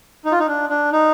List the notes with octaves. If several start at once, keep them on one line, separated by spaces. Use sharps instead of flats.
D#4
F4
D#4
D4
D4
D#4